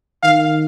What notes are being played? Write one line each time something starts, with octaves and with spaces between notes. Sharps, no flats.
D#3 F5